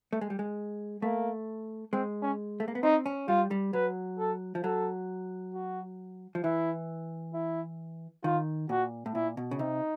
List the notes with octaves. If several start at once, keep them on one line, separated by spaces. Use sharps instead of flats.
A3
G#3
G3
G#3
A3 A#3
G#3 C4
C#4
A3
A#3
B3
C4 D#4
C#4
G3 F4
G3
F#3 B4
A4
F3
F#3 A4
F#4
F3
E3 E4
E4
D#3 F4
A#2 F#4
A2
A#2 E4
B2
C#3
C3 D#4